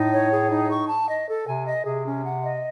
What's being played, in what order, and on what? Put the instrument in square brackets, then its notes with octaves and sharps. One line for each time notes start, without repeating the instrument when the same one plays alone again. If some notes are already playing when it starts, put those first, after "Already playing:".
Already playing: [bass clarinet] A2 [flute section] D#4
[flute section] C#5
G#4
D#4
C#6
A5
D#5
A4
[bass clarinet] C3 [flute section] G#5
[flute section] D#5
[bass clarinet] C3 [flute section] G#4
[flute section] C#4
F#5
D#5